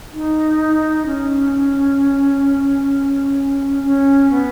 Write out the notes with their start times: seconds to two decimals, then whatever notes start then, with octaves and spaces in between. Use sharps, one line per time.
0.14 D#4
1.06 C#4
3.84 C#4
4.31 B3